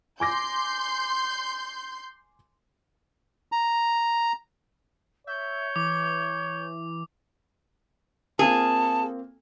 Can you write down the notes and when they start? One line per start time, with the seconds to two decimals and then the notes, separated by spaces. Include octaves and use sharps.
0.20 G#5 C6 D6 G6 A#6
3.52 A#5
5.27 C#5 E5 G6
5.76 E3 D6
8.39 A#3 C4 F4 G#4 A5